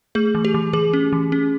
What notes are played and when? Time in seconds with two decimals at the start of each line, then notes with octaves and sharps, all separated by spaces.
0.15 A3 G#4
0.35 E3
0.45 G4
0.54 E3
0.73 E3 G#4
0.93 C#4
1.13 E3
1.32 C#4